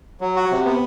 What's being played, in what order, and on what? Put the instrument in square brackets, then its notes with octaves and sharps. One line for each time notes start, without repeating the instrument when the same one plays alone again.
[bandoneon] F#3
F#4
C3
B3